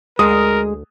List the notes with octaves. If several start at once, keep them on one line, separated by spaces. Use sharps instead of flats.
D2 G#3 A#4 D#6